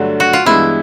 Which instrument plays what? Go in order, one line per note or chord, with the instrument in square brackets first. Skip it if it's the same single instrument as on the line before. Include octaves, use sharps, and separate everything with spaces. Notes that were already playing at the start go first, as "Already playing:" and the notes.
Already playing: [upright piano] G2 D3 F#3 A3
[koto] F#4
F4
[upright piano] G2 E3 G#3 B3 [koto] E4